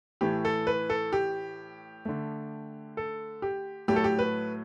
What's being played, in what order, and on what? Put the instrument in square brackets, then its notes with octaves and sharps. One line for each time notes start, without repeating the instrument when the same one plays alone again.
[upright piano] A2 E3 A3 G4
A4
B4
A4
G4
D3 A3
A4
G4
A2 F#3 A3 G4
A4
G4
B4